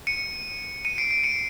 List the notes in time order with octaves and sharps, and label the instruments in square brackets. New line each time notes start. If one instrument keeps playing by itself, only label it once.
[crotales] C#7 D#7
C#7 D#7
C7 D7
C7 D7
C#7 D#7